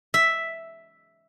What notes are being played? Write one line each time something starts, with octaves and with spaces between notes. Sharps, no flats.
E5